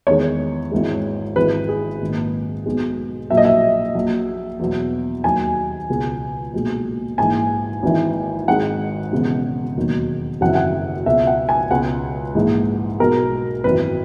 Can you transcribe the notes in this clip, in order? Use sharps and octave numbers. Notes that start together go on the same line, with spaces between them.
E2 D#3 G#3 C#5
G#1 G#2 E3 G#3
G#1 G#2 E3 G#3 B4
G#4
A#1 G#2 D#3
B1 B2 G#3
A#1 A#2 F#3 E5
D#5
E5
A#1 A#2 F#3
E2 B2 F#3
D#2 D#3 F#3 G#5
C#2 B2 G#3
B1 A#2 G#3
A#1 G#2 E3 G#5
G#1 G#2 E3
G#1 G#2 D#3 G#3 F#5
E1 E2 C#3 G#3
E1 D#2 D#3 F#3
G#1 F#2 C#3 E3 F#5
E5
F#5
C#2 B2 G#3 E5
F#5
G#5
C#2 B2 G#3 F#5
A#1 G#2 E3 G#3
B1 B2 G#3 A#4
G#1 F#2 E3 B4